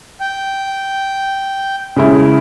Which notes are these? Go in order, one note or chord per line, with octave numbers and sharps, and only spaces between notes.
G5
C#3 G#3 E4